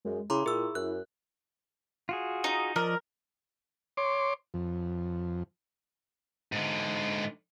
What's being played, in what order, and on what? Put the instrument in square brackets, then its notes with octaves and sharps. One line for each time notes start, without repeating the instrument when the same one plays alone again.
[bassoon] F#2 [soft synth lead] G#3
[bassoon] C#3 [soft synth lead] E4 [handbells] A#5 C6 D6
[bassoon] A#2 [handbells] G#4 E6
[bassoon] F#2 [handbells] F#6
[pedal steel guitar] F4 F#4 G#4
[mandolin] D#4
[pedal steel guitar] F3 D5 D#5 [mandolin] A#4
[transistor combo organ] C#5 C6 D6
F2
[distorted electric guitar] G#2 D3